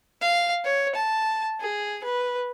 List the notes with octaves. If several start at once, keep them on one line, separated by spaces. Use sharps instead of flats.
F5
C#5
A5
G#4
B4